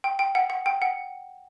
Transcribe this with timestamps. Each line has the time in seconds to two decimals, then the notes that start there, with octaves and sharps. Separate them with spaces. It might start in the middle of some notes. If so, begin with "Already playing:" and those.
0.04 G5
0.19 G5
0.35 F#5
0.50 F#5
0.66 G5
0.82 F#5